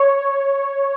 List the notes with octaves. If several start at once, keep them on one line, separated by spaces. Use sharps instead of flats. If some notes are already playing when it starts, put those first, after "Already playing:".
Already playing: C#5